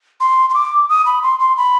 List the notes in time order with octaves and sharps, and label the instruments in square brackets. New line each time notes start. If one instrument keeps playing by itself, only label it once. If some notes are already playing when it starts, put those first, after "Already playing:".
[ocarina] C6
C6
D6
D#6
B5
C6
C6
B5